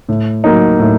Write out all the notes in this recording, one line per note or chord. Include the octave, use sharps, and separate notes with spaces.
A2
F#3 A#3 D#4
A2